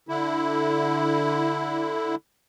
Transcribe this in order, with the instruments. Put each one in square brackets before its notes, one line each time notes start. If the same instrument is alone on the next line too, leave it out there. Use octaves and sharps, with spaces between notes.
[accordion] D3 E4